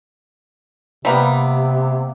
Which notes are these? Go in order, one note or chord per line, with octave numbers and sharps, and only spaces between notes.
C3 G3 A#3 B3